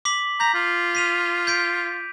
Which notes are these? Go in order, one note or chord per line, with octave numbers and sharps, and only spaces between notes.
D6 B6 F#7
A#5 G6 B6
F4
B6 D#7 F7
G6 B6 D7